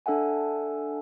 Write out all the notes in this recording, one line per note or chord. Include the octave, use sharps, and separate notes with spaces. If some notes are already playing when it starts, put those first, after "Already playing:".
D4 A4 E5 F#5 G#5